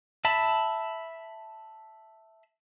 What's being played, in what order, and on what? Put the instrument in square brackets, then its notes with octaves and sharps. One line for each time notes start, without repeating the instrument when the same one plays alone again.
[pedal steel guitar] E5 A5 B5